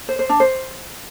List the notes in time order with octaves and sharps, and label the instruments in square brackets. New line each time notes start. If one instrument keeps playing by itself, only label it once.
[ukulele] C5
C5
D4
C5